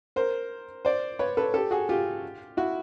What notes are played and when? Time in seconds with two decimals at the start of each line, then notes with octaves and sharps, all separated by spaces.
0.16 A#4 C5
0.85 C5 D5
1.19 B4 C#5
1.37 A4 B4
1.54 G4 A4
1.71 F#4 G#4
1.89 F4 G4
2.57 E4 F#4